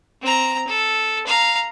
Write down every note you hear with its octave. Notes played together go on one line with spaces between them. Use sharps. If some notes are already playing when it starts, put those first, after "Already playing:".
C4 A#5
A4
F5 A#5